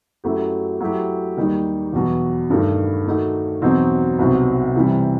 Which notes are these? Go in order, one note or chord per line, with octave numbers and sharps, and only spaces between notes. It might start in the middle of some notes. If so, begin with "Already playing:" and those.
F#2 F#3 A3 E4 G4
F#3 A3 E4 G4
D#2 D#3 G3 D#4
E2 B2 F#3
G2 D#3 A3
D#3 A3 D#4 F#4
E2 B2 F#3 C4 D#4
C2 B2 F#3 C4 D#4
C3 E3 G3